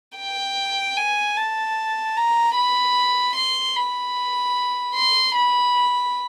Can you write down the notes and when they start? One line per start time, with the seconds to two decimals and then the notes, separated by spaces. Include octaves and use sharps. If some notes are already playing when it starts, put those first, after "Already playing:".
0.17 G5
0.96 G#5
1.37 A5
2.16 A#5
2.56 B5
3.36 C6
3.76 B5
4.95 C6
5.35 B5